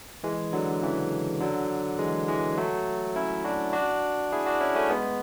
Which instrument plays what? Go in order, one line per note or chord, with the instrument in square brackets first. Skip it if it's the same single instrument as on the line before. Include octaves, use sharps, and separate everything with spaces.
[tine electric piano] E3 G#3
D3 F#3
C#3 E3
D3 F#3
E3 G#3
E3 G#3
F#3 A3
C#4 E4
D4 F#4
D4 F#4
E4 G#4
D4 F#4
C#4 E4
A3 C#4
G#3 B3